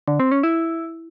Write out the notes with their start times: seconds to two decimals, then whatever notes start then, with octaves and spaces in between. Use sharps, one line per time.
0.08 D3
0.20 C4
0.31 C#4
0.43 E4